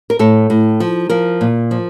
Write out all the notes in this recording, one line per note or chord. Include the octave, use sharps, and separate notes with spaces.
A#4
A2 A4
A2
F3
F3 A#4
A#2
F3